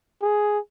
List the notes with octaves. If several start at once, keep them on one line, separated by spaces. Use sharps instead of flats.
G#4